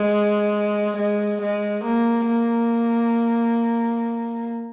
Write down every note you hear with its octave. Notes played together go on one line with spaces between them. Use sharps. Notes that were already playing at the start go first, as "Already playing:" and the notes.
Already playing: G#3
G#3
G#3
A#3
A#3